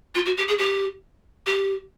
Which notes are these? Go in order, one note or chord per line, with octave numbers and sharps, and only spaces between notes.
F4
F#4
G4
G#4
G4
G4